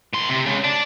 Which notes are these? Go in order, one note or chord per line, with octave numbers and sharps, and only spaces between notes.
A2 C6
C3
C#3 G#3
D5 A5